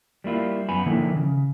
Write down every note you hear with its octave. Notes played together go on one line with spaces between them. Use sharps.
G3 A#3 E4 F4
F#2 B3 G#5 B5
D3 D#3 F3 A#3 E4
C#3